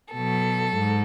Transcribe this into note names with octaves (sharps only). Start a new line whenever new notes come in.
B2 F#3 A4
G#2